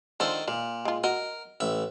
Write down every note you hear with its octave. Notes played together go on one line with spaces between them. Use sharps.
D3 D#3 F3 A4 C5
A#2 F5
G#3 F4
F#4 A#4 D#5
A1 E5